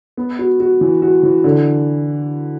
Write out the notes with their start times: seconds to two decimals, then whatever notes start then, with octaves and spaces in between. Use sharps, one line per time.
0.17 B3
0.39 F#4
0.60 F#4
0.81 E3
1.02 F#4
1.23 E3
1.44 D3